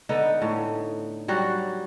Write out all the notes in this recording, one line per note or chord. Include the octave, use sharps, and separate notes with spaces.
D3 B3 D#4
A2
F#3 G3 F#4